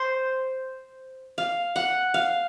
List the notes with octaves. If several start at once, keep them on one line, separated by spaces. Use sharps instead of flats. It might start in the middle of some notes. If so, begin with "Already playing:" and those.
Already playing: C5
F5
F#5
F5